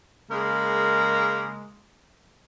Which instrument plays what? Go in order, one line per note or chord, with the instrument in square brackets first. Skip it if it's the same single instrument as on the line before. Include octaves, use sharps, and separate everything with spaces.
[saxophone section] C#3 G#3 A#3 A#4